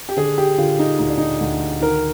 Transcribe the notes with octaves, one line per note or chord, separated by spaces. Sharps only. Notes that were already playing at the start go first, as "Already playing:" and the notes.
G4
D3 G#4
G4
D3 F4
D#4
D2 D#4
D4
D#4
D2
D#3 A#4